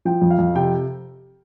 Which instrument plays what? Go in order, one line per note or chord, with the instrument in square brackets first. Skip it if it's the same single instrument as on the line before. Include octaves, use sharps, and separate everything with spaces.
[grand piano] F3 G5
F2
F5
F2
C3 G5